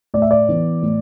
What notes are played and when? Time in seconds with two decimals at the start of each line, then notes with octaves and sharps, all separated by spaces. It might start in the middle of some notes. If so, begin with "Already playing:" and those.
0.14 A2 D5
0.22 E5
0.31 D5
0.49 E3 B3
0.82 A2